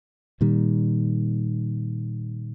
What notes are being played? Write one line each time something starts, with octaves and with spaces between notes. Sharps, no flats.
A#2 D#3 G3